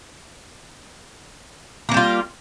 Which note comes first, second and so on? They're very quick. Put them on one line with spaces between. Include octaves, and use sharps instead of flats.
A#3 E3 G3 F4